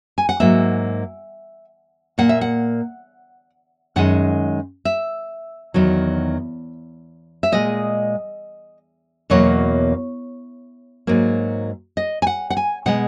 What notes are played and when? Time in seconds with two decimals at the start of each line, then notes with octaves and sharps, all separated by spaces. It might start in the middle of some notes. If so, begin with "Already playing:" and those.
0.18 G#5
0.29 F#5
0.40 G#2 F#3 A#3 E5
2.18 A#2 A#3 F#5
2.29 E5
2.41 F#5
3.96 F#2 D#3 G#3 F#5
4.85 E5
5.74 E2 D#3 F#3
7.43 E5
7.52 A#2 G#3 D#5
9.30 E2 B2 F#3 A#3 C#5
11.07 G#2 F#3 A#3
11.97 D#5
12.22 G#5
12.27 F#5
12.50 F#5
12.57 G#5
12.86 B2 G#3 F#5